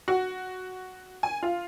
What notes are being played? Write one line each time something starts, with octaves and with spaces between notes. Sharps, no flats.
F#4
G#5
F4